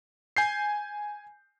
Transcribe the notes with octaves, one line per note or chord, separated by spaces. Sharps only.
G#5 G6 C7